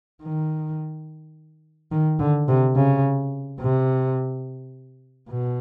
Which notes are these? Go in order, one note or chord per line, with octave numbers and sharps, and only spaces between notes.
D#3
D#3
D3
C3
C#3
C3
B2